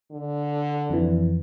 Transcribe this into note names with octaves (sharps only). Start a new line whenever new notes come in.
D3
F2 E3